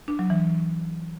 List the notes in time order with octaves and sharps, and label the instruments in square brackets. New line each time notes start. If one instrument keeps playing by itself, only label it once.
[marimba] D4
F#3
E3